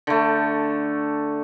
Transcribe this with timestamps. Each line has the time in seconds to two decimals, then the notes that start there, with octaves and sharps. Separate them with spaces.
0.07 D3 A3